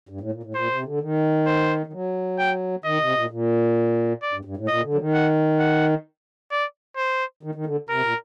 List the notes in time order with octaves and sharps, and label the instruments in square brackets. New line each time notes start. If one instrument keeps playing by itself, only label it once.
[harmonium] G2
A2
A#2
A2
[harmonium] A#2 [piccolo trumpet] C5
[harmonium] C3
D3
D#3
[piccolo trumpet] C5
[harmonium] D#3
F#3
[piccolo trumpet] G5
[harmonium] D#3 [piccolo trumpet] D#5
[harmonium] C3
A#2
A#2
[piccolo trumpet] D5
[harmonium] G2
G2
A2
[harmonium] A#2 [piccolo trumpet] D#5
[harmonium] D3
F#3
D#3
[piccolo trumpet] F#5
F#5
D5
C5
[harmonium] D#3
D#3
D3
[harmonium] C3 [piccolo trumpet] A#4
[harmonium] A#2